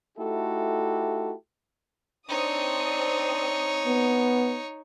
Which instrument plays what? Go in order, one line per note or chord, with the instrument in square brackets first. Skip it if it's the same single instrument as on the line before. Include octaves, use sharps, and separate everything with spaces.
[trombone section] A3 D#4 E4 F#4 G4 A4
[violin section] C4 D4 D#6 [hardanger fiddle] D#4 C#5
[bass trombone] B3